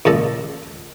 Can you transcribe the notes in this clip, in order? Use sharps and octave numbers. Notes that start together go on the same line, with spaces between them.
C#2 A#2 A4 D#5